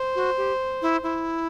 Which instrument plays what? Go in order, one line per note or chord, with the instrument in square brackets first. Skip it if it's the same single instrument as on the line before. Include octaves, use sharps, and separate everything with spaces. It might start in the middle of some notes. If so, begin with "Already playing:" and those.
Already playing: [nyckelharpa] C5
[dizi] F#4
G4
E4
E4